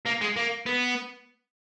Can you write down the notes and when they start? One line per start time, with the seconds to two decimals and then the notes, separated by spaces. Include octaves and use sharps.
0.06 A#3
0.21 G#3
0.37 A#3
0.66 B3